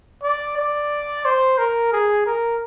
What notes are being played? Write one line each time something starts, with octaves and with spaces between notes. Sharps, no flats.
D5
D5
C5
A#4
G#4
A#4